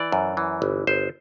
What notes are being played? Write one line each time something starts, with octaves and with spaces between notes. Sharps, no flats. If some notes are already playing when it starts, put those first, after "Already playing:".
Already playing: E3 D5
F#2
E3
G1
G1 C5